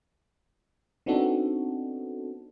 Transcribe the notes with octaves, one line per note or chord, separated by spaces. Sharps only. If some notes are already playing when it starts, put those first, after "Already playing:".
B3 C4 D4 D#4 F#4 A4